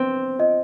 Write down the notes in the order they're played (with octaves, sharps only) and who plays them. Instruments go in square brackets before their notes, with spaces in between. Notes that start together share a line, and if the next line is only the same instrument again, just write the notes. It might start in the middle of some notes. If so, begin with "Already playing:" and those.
Already playing: [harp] C4
[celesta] F4 C5 D#5